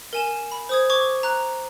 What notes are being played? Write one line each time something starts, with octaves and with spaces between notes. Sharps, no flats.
A#4 G#5 E7
B5
C5 D#6 G#6
C#6 D6 G#6
A#5 F#6